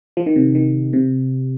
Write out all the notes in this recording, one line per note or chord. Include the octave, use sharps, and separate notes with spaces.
F3
D#3
C3
D#3
C3